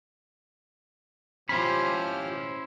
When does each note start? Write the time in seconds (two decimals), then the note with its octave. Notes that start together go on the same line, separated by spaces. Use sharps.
1.49 F3 C#4 E4 G4 C5 B5 F6